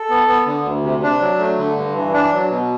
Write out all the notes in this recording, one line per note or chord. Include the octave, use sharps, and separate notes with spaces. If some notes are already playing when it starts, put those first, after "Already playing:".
Already playing: A4
B3
B3
D3
D2
C3
D4
F#3
A3
D3
G2
E3
D4
F#3
B2